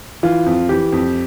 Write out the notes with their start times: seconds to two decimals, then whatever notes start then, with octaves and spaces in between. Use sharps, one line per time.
0.23 E3 F4
0.46 F2
0.69 E3 G4
0.92 F2